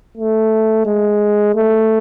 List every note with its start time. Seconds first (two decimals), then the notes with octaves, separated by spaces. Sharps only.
0.18 A3
0.86 G#3
1.56 A3